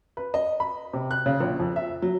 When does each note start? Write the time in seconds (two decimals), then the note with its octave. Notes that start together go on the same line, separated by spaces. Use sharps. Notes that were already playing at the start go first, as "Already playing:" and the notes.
0.17 B4
0.34 D#5
0.60 B5
0.93 C3
1.11 F#6
1.26 C#3
1.40 A#1
1.60 F2
1.76 E5
2.02 F#3